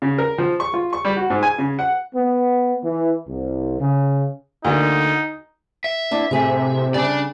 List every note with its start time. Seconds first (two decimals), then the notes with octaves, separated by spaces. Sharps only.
0.02 C#3
0.18 A#4
0.38 F3
0.60 C#6
0.74 F4
0.93 C#6
1.05 G3
1.17 F#4
1.30 G#2
1.43 G#5
1.58 C#3
1.79 F#5
2.15 B3
2.84 E3
3.28 C2
3.79 C#3
4.65 D2 D3 A#3 D#4
5.84 E5
6.11 B3 D4 E4
6.31 A2 C3 G#4
6.94 C#3 G3 D4 D5